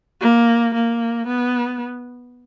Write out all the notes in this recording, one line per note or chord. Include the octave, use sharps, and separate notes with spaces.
A#3
A#3
B3